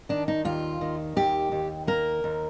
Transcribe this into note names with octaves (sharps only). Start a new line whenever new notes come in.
D#3 D4
D#4
D#2 F4
D#3
D#2 G4
D#2
A#3 A#4
D#2